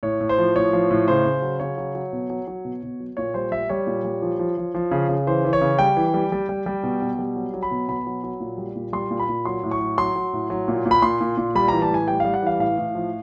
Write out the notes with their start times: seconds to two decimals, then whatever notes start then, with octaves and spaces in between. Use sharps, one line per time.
0.03 A2 C#5
0.21 A2
0.29 C5
0.38 F3
0.56 A2 C#5
0.73 F3
0.91 A2
1.08 C#3 C5
1.25 C#3
1.42 F#3
1.60 C#3 C#5
1.78 F#3
1.95 F#3
2.13 B2
2.30 F#3
2.47 F#3
2.65 B2
2.83 B2
3.00 F#3
3.17 A#2 C#5
3.34 G3 C5
3.52 G3 E5
3.69 G3 C#5
3.87 A#2
4.04 G3
4.22 F3
4.39 F3
4.58 F3
4.75 F3
4.91 C#3
5.09 C#3
5.27 E3 C5
5.45 E3
5.53 C#5
5.61 C#3
5.79 G3 G5
5.97 E3
6.14 G3
6.32 G3
6.49 G3
6.66 G3
6.83 B2
7.02 B2
7.19 G3
7.36 F#3
7.54 F#3
7.63 B5
7.71 B2
7.88 B2 B5
8.07 F#3
8.24 F#3
8.40 A#2
8.58 G3
8.76 A#2
8.93 G3 C6
9.11 A#2
9.20 B5
9.29 A#2
9.45 F#3 C6
9.63 A2
9.71 C#6
9.80 F#3
9.98 F#3 C6
10.16 F#3
10.33 A2
10.50 F#3
10.68 A#2
10.86 A#2
10.91 B5
11.02 A#2 C6
11.21 A#2
11.37 A#2
11.55 G3 B5
11.68 E3 A#5
11.82 A5
11.90 A2 G#5
12.08 G3 G5
12.20 G3 F5
12.34 F#5
12.42 E3 F5
12.59 A2 F5
12.78 A2
12.95 F3